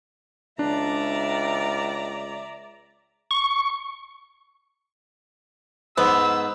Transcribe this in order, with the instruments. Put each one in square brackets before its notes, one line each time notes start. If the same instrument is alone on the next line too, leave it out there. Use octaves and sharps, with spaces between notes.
[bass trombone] C#2 [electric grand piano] D4 [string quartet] D5 E5 A#5
[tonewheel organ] C#6
[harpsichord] G#2 [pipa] B3 [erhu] E6